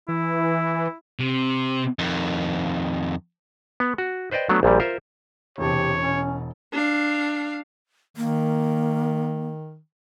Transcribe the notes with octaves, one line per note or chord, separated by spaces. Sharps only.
E3 E4
C3
F2 D#3
B3
F#4
B4 C5 D5 D#5 G5
F#3 A3 B3 D4
A#1 A#2 G3
F4 A#4 C5 E5
E1 C3 E3 G4 C#5 A5
B2 C#4
D4 F5
D#3 A#3